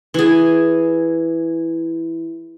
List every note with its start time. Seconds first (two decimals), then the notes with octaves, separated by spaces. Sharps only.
0.14 E3 G#4